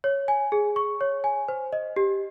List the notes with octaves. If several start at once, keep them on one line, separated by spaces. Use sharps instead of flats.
C#5
G#5
G#4
C#6
C#5
G#5
C5
D#5
G4